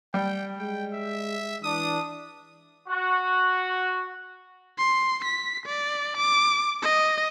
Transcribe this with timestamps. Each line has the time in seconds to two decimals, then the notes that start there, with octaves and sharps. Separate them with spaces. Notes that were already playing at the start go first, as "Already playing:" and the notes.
0.14 G3 G5
0.59 G#3 G5
0.93 E5
1.64 E3 D4 D#6
2.88 F#4
4.78 C6
5.25 B6
5.66 D5
6.17 D6
6.82 D#5